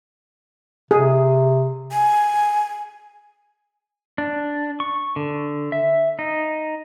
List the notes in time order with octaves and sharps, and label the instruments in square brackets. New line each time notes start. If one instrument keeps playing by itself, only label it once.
[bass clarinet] C3 [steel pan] G#4
[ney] G#5
[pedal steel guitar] D4
C#6
D3
E5
D#4